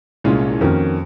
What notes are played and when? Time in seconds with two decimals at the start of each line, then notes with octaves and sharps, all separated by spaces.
0.24 C2 A#2 G#3 C#4 F4
0.61 F2 D#3 A#3 C#4 F#4